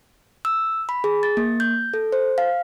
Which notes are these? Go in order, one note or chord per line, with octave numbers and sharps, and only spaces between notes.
E6
B5
G#4
A6
A#3
G6
A4
C5
F5